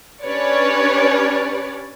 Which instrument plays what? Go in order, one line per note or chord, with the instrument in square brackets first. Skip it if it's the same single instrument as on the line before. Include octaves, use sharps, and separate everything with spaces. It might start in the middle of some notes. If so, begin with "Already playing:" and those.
[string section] C#4 D4 G4 B4 C#5 D5